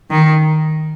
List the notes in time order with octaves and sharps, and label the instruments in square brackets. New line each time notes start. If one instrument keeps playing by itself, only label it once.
[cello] D#3